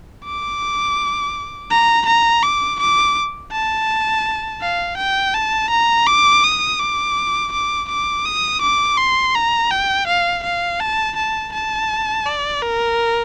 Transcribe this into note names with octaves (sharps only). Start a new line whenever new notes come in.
D6
A#5
A#5
D6
D6
A5
F5
G5
A5
A#5
D6
D#6
D6
D6
D6
D#6
D6
C6
A#5
G5
F5
F5
A5
A5
A5
D5
A#4